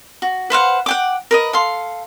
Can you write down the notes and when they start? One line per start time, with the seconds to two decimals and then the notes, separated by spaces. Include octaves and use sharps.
0.22 F#4
0.50 B4 C5 F5 F#5
0.86 F#5 G5 D6
1.31 A#4 B4 D#5
1.53 A4 F5 C6